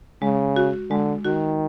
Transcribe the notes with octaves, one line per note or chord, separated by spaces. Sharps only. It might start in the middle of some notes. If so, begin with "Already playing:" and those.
C#3 G#3
F#4
D3 G#3
D#3 F#4